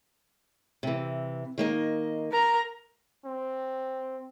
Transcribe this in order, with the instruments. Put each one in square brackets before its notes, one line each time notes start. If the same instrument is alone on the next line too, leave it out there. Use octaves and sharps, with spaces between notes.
[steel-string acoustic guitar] C3 E3
D#3 A#3 D#5
[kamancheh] A#4 A#5
[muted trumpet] C4